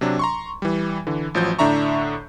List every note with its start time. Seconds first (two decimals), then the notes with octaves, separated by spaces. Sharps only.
0.01 C3 F#3 D4
0.19 A#5 C6 C#6
0.62 E3 G3
1.07 D3 E3
1.34 A1 F3 F#3 G6
1.59 A2 D3 D4 E5 A#5 C#6